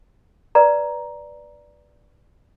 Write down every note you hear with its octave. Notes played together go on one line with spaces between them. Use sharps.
B4 D5 A#5